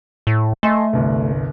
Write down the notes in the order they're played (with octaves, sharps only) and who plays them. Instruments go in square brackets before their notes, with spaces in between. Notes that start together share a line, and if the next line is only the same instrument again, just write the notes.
[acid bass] A2
[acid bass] A3 [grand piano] D#5 G#5 C6
[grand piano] G1 C2